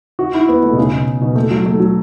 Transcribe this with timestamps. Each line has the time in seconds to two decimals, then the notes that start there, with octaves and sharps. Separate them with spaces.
0.19 F#4
0.34 E4
0.49 B3
0.63 A3
0.73 B2
0.78 C#3
0.92 B2
1.21 B2
1.36 A3
1.50 F#3
1.66 A3
1.80 F#3